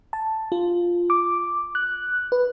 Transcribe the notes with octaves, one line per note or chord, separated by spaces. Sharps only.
A5
F4
D6
F#6
B4